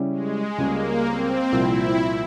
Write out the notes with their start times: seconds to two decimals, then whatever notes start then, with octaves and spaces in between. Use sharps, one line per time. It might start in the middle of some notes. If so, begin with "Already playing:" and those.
Already playing: C#3 G3 C#4 E4 G4
0.12 G#3
0.58 C#2 C#3 G3 A#3 C#4
1.06 C4
1.52 C2 A#2 F3 E4